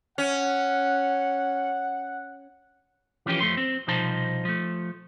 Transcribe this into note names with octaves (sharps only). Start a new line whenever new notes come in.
C#4 F#5
E3 F3 C#4 G4 B4
F2 F3 A3 C6
C4
C2 B2 F3 D#4 C5 A5
F3 A3